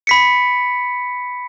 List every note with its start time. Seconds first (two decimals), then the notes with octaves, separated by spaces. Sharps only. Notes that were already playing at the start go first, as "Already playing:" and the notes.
0.07 B5 B6 C#7